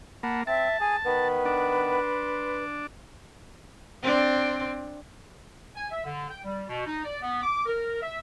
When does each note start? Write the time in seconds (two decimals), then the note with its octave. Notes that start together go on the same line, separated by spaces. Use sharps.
0.23 A#3 F#5 A5 B5
0.47 C4 E5 A5
0.80 G#4 G#5
1.05 D#3 B3 B4
1.45 D4
2.03 C6
4.03 C4 D4
5.76 G#5
5.90 E5
6.04 D3
6.29 G5
6.44 G3
6.69 B2
6.86 D#4
7.04 D5
7.22 B3
7.42 D6
7.66 A#4
8.02 E5